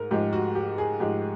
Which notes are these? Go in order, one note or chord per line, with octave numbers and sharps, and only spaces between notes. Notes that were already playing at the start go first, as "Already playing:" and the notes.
Already playing: G#2 A#4
G#2 F3 G#3 G4
F#4
G4
G#4
G#2 F3 G#3 G4